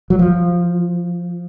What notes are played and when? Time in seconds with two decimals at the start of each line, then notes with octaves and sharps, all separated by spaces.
0.10 F#3
0.19 F3